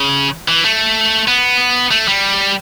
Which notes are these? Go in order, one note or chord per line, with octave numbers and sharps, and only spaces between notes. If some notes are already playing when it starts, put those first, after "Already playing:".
Already playing: C#3
E3
A3
B3
A3
G3